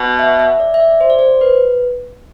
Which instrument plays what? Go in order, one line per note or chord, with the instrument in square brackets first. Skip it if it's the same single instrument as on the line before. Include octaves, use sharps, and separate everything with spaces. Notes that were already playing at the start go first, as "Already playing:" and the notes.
Already playing: [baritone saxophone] B2
[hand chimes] E5
E5
D5
E5
D5
C5
D5
C5
B4